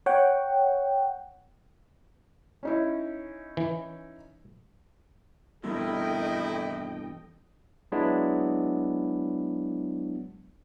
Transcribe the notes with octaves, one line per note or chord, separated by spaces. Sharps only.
C#5 F#5 G5
C#4 D#4 E4
E3
E2 G2 B2 D#3 E4 A4 D#5 G5
F#3 G#3 B3 D4 E4